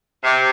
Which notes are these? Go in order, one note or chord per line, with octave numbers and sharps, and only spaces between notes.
C3